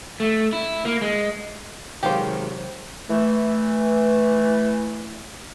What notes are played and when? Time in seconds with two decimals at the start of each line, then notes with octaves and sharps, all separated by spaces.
0.20 A3
0.53 E4
0.85 A#3
1.01 G#3
2.03 C3 D#3 F#3 G#3 G4 C5 F5
3.10 E3 A3